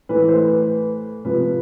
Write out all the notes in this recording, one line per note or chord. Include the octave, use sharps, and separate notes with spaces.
A2 E3 B4
C5
B4
C3 F3 B4